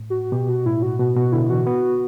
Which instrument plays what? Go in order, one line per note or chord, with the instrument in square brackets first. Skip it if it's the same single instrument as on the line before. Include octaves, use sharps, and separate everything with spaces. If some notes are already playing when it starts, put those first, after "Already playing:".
Already playing: [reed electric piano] A2
[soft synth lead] F#4
[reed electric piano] B2 [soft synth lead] G4
[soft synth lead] F#4
[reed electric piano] A2 [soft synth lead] E4
[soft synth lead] F#4
[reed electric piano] B2 [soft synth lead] F#4
[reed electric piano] B2 [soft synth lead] F#4
[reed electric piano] D3 [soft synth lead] E4
[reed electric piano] E3 [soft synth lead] F#4
[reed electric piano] B3